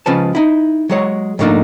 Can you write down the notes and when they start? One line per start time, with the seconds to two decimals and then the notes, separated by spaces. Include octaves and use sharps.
0.06 C#2 C#3 F3 B4 A5
0.35 D#4 E4
0.90 F#3 G#3 C#5
1.39 G#2 F3 A3 A#3 D4 D#4